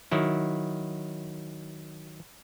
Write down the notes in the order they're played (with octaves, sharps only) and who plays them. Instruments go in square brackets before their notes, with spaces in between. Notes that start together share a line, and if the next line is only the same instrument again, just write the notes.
[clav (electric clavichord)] D#3 F#3 E4